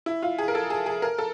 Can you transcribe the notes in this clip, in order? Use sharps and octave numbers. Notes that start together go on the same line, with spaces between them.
E4
F4
G#4
A#4
A4
G#4
G#4
A#4
A4